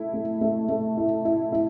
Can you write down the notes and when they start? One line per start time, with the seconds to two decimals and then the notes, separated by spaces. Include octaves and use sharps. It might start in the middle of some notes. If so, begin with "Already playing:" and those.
Already playing: A3 E4
0.13 A3
0.41 A3
0.69 A3
0.97 E4
1.25 E4
1.52 E4